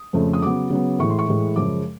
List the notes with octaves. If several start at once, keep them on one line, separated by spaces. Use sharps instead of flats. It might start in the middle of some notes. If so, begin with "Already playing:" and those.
Already playing: D#6
F2 C#3 F3 A3
D#6
C#3 F#3 B3 D6
C#3 F#3 B3
A2 E3 G#3 C#6
C6
C#6
A2 E3 G#3
F#2 C#3 F3 G#3 D6